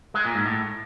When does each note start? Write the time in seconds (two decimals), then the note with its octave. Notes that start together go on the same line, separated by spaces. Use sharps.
0.14 G#3
0.25 A#2
0.35 G#2
0.46 A2